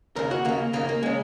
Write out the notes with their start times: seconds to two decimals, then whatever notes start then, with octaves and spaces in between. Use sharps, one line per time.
0.16 D#2 C#3 A#4
0.31 F#4
0.45 D#2 C#3 A#3
0.73 D#2 C#3 A#3
0.89 A#3
1.03 C#3 G#3